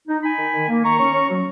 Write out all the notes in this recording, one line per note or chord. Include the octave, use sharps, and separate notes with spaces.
D#4
D#4 G#5 B5
D#3
D#3
A#3
D#3 A#5 C#6
C#4
C#4
F#3